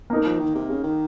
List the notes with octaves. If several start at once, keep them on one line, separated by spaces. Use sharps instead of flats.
A#3 D#4 A#4
F3
D#3
C3
C#3
D#3